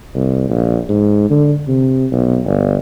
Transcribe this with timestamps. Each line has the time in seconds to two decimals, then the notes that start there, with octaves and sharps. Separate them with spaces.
0.15 C2
0.49 A#1
0.89 G#2
1.30 D3
1.68 C3
2.12 B1
2.45 G1